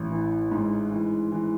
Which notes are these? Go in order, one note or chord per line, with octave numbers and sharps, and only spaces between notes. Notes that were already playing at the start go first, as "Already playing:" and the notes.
Already playing: A1
E3
G#2
E3
E3